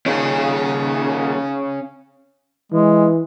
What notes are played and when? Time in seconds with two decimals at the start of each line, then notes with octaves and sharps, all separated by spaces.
0.06 A#2 D#3 C#4 G#4
2.72 E3 G#3